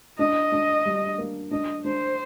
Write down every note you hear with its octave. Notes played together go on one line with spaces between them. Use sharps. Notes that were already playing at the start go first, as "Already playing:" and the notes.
D4 D#5
D4
G3
A#3
D4 D#5
D4 C5